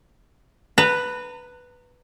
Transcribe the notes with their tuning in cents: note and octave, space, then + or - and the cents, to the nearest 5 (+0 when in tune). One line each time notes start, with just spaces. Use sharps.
B4 +0 A#5 -35